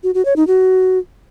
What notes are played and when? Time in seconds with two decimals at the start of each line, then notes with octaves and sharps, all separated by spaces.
0.03 F#4
0.14 F#4
0.25 C#5
0.36 D#4
0.47 F#4